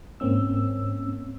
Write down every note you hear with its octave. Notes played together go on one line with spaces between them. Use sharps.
G#2 A#3 C4 C#4 E6